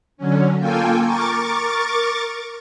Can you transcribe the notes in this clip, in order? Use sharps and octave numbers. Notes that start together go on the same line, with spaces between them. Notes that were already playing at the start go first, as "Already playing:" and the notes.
D3 F#3 C#4
A#3 F4 A4 G5 G#5
A#4 C#6 D6 A6